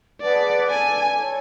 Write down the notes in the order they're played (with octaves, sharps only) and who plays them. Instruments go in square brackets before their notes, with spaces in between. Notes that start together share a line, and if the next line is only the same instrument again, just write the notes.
[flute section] G#4 B4 F#5 A5 [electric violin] D5
[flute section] A4 D5 A5 [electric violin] G#5
[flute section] E4 A4 C#5